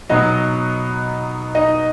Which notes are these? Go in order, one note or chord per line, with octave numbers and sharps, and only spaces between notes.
B2 F#3 B3 D#4 D#5
D#4 D#5